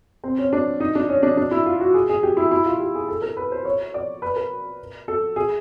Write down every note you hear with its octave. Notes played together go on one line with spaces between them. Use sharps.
C4
C#4
D4
D#4
D4
C#4
D4
D4
E4
F4
F#4
G#4
G#4
G4
E4
E4
F4
G4
G#4
A4
A#4
B4
C5
C#5
D5
B4
A#4
A4
G#4